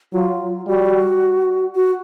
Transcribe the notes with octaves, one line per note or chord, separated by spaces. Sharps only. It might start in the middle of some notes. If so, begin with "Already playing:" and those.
F#3 F4
G3 F#4
F#4